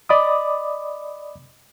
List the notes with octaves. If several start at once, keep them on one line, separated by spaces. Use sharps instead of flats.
D5 D#5 B5 D6 D#6